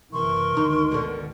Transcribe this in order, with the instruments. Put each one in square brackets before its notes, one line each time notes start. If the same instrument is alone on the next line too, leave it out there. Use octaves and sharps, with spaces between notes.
[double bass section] F#1 C3 E3 [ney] A#4 [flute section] C6 C#6
[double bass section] G#1 D2 D#3 [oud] D#4
[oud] B2 D3